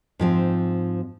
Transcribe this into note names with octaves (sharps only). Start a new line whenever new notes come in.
G#2 F3 C4